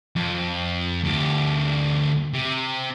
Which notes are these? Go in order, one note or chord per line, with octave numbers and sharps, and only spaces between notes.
F2
D2 G4
C3